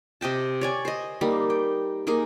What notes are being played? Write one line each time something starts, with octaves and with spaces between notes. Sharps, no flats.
C3 D#5 G5 A5
C#5 D5 G#5
C5 D#5
G3 A#3 D#4
G5
A#3 D#4 G#4 A#4